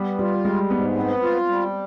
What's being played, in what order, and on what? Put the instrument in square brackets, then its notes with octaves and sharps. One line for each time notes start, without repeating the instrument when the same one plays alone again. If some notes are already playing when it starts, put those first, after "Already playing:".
Already playing: [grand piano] G3 [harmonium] B3
[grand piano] G3 [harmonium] F4
[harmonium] G3 [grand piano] G#3
[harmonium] G#2 [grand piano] B3
[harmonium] B3 [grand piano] C4
[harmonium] F4
G3